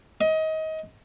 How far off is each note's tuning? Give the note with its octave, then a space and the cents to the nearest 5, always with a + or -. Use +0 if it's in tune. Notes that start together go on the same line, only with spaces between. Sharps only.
D#5 +25